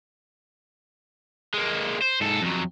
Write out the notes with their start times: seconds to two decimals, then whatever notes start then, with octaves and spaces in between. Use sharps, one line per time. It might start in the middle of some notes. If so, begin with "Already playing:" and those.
1.54 G#3 A#3
2.01 C5
2.21 G#2 A4
2.42 F2 F#3